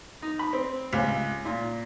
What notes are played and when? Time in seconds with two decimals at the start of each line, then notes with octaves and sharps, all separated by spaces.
0.22 D#4
0.39 B5
0.53 C4
0.93 C#2
1.45 A#2